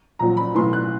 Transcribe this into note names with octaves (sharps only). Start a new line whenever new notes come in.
A#1 A#2 F#3 A#5
B5
B1 A2 E3 C6
F#6